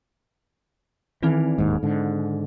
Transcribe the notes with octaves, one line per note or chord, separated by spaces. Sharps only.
D#3 E3 C4 D#4
D1 D#2 G#2
G#2 D3